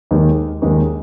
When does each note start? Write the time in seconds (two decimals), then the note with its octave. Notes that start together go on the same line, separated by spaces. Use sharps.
0.11 D#2 D#3 G#3 D#4 A#4
0.62 D#2 D#3 G#3 D#4 A#4